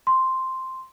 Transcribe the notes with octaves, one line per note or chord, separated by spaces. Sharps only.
C6